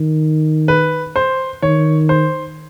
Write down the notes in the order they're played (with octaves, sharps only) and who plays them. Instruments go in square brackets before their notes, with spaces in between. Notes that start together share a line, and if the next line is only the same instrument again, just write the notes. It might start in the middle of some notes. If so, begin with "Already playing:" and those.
Already playing: [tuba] D#3
[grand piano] B4
C5
[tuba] D#3 [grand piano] C#5
[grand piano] C5